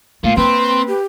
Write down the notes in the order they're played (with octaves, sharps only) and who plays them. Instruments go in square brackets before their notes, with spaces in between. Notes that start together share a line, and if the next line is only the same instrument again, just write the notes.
[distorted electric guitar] A#2 [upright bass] A3 [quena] F5
[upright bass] A#3 [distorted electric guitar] C4 [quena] B4 [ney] C6
[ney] G4